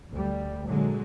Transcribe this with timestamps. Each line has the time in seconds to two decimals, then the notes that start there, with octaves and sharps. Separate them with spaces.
0.13 D2 G3
0.68 A#2 D3 F#3 G#3